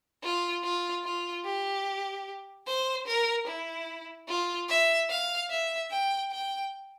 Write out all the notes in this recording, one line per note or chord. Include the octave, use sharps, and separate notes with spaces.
F4
F4
F4
G4
C5
A#4
E4
F4
E5
F5
E5
G5
G5